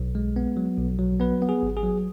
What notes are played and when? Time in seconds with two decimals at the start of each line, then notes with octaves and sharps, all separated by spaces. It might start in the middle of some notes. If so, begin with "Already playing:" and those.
Already playing: B1
0.15 G#3
0.36 B3
0.57 F#3
0.78 B1
0.99 F#3
1.20 B3 B4
1.42 B3
1.49 G#4
1.63 G#1
1.77 G#4
1.83 F#3